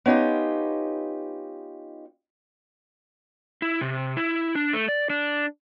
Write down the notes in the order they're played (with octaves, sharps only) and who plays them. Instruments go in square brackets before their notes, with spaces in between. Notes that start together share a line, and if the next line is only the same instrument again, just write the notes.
[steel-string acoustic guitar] B3 C#4 D#4 F4 G4
[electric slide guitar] E4
C3
E4
D4
A3
D5
D4